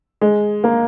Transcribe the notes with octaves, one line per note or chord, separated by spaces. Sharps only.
G#3
A#3